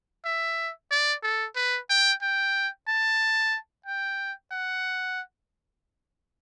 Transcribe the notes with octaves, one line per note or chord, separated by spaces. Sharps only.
E5
D5
A4
B4
G5
G5
A5
G5
F#5